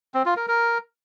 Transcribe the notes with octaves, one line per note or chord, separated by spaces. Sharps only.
C4
F4
A#4
A#4